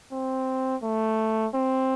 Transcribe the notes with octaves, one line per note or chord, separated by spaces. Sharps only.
C4
A3
C4